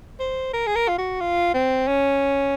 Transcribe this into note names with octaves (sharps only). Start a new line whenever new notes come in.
C5
A#4
G#4
A#4
F4
F#4
F4
C4
C#4